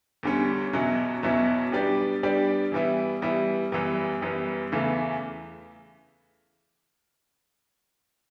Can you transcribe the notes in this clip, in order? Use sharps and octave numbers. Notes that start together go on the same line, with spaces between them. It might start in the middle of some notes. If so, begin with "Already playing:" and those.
E2 D3 G3 C#4
E2 B2 F#3 C#4 E4
E2 B2 F#3 C#4 E4
G3 B3 D4 G4 D5
G3 B3 D4 G4 D5
E3 G3 B3 E4
E3 G3 B3 E4
F#2 E3 G3 B3
F#2 E3 G3 B3
E2 C#3 E3 A3